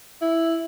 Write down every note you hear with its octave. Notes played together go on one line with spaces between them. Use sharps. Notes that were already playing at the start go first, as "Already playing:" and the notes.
E4